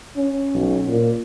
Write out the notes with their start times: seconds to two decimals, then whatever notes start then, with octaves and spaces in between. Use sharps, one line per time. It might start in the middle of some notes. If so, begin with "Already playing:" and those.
0.16 C#4
0.54 B1
0.88 A#2